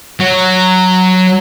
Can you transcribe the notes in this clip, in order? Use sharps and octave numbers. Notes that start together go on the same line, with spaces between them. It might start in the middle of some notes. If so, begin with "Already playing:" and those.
F#3